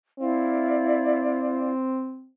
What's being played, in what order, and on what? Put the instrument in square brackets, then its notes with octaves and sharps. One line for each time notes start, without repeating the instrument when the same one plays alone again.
[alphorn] C4 [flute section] E4 D5 F5